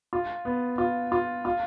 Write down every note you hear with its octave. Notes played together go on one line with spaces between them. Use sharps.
F4
B3
F4
F4
F4